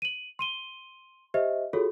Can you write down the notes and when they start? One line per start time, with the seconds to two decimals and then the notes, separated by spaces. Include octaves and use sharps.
0.02 D#7 F#7
0.39 C6 D#7 G7
1.34 G4 C5 D#5 E5
1.73 F4 F#4 G#4 A4 C#5